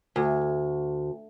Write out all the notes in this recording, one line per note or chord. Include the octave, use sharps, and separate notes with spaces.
D2